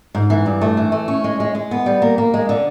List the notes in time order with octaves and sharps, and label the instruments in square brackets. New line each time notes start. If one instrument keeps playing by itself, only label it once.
[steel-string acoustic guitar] G#2
E3
G2
A3
E3
A3
C#4
G#3
G#3
G#3
B3
G3
A#3
A#3
G#3
D3